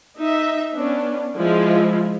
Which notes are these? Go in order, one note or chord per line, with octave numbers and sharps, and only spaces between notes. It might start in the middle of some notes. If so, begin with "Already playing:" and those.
D#4 E5
B3 C#4 D4
F3 G#3 E4 F4